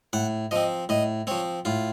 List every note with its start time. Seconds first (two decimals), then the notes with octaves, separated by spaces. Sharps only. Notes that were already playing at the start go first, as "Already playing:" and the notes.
0.13 A2 F#5
0.51 F3 C4 D#5
0.89 A2 D#5
1.27 F3 C4 C#5
1.65 A2 F4